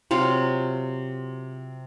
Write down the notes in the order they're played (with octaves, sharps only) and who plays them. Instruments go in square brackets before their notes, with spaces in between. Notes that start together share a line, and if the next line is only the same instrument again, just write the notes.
[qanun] C3 F#3 F4